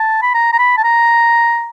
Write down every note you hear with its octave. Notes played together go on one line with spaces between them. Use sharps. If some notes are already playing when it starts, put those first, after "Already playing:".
Already playing: A5
B5
A#5
A#5
B5
A5
A#5